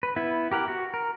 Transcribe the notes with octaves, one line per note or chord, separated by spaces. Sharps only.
B4
B3 E4 B4
G4 A#4 F#5
F#4
A#4